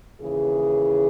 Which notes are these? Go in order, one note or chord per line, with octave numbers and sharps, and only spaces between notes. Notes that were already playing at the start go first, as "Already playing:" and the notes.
D#2 C#3 E3 G#4